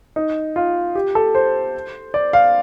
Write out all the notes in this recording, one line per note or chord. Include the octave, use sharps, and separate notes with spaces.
D#4
F4
G4
A4
C5
D5
F5